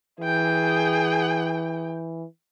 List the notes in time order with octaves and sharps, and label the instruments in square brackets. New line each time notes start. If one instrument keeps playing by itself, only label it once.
[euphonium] E3 [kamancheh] G#4 G5